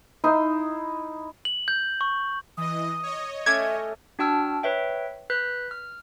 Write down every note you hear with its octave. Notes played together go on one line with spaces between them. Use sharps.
D#4 E4 C6 D#6
F#7
G6
C#6
E3 D#5 D#6
C#5 D#5
A3 C#4 E5 D6 G#6
D4 F#4 G5 A5 E6 F6
B4 C#5 E5 G5
B4 F#6 G6 B6
F6